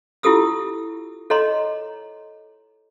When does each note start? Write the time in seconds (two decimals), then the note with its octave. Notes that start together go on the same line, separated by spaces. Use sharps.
0.23 E4 F4 G4 A4 D#6 E6
1.30 A4 C#5 D#5 A#5 C6